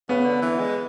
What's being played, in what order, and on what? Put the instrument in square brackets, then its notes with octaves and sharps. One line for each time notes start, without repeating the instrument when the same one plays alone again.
[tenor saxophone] C#3 [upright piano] B3
[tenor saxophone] D3
E3
G#3